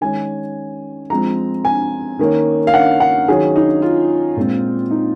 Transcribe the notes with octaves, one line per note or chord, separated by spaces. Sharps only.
D#3 G#3 C#4 G#5
F3 G#3 C4 A#5
G#5
D#3 A#3 C#4
F5
F#5
F#5
D#3 F#3 C#4 G#4
D#4
F4
A#2 G#3 C4
D#4